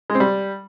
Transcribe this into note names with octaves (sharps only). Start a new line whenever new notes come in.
G#3
C4
G3